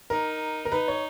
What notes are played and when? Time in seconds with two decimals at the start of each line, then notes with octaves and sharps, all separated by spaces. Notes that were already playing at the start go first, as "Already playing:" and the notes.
0.10 D#4 A#4
0.65 A#4
0.72 D#4 B4
0.88 C#5